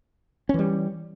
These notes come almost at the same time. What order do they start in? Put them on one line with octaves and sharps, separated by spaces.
C#4 E3 G3